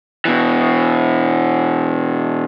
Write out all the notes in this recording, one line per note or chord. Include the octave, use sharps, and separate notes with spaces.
B2 E3